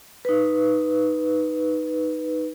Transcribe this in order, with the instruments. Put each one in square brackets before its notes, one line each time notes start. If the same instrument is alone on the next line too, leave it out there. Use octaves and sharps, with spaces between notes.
[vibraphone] D#4 B4